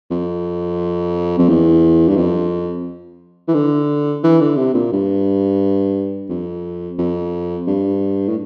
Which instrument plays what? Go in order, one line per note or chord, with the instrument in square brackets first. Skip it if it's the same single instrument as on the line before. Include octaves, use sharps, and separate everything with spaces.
[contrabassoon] F2
F2
E2
G2
F2
E3
D3
E3
D3
C3
A#2
G2
F2
F2
G2
A2